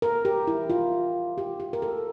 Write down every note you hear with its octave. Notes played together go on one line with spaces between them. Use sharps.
A#4
G4
E4
F4
G4
G4
A#4
A4